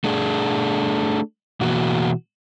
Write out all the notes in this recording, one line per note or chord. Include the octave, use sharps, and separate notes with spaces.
A3 D4 G#4
B2 E3 A#3 F#4